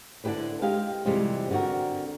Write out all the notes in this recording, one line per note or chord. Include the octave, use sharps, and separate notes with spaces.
D3 D4 E4 G4 B4 C5
G#3 G4 F5
F2 C3 E3 G3 G#3 C4
D3 B3 C4 F#4 A#4